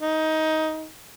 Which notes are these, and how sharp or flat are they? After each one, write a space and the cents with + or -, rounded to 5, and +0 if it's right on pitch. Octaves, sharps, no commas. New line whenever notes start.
D#4 +15